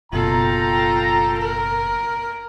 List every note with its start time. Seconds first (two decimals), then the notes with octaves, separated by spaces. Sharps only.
0.13 F#1 B2 F4 A4 G5 A#5
1.38 A#4